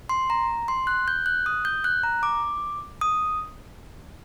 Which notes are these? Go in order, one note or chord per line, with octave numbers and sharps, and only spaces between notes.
C6
A#5
C6
F#6
G6
F#6
D#6
G6
F#6
A#5
D6
D#6